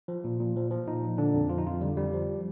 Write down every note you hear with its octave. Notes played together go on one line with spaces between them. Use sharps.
F3
A#2
A#2
F3
F3
A#2 D#4
A#2
D3 D4
F2
F3 F4
D#4
F2 F4
D3 G3
F2 G3
F3